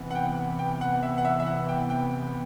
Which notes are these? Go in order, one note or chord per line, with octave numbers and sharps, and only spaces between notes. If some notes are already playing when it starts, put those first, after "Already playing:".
Already playing: C3 E3 B3
F#5
G5
G5
F#5
E5
F#5
E5
E5
F#5
G5
G5